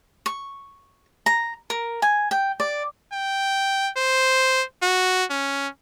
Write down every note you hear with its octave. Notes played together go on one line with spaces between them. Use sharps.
C#6
A#5
A#4
G#5
G5
D5
G5
C5
F#4
C#4